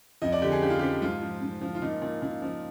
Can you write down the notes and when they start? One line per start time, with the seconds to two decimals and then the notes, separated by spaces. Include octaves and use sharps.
0.22 F2 D#5
0.32 D5
0.41 D3 G4
0.52 G#4
0.62 F3 G4
0.70 F4
0.79 F3 G4
1.02 G#2 F4
1.22 F3
1.42 G#2
1.62 F3
1.75 F4
1.82 A#2 D#4
2.02 A#2
2.22 A#2
2.42 F3